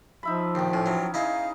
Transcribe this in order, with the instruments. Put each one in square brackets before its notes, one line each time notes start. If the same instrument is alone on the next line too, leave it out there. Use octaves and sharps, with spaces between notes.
[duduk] F3 [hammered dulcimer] D#4 E5 B5
[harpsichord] A#1 D#2 [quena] G5
[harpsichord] A2 [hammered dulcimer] C#4
[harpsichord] E3 F#3
[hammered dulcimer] D#4 G#4 [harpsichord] E4 D#5 [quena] F5